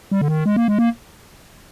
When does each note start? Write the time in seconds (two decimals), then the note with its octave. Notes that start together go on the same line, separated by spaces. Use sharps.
0.11 G3
0.21 D3
0.28 D#3
0.46 G#3
0.56 A#3
0.68 G#3
0.78 A#3